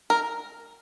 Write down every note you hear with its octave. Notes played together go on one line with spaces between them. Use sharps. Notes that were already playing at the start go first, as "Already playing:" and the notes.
A#4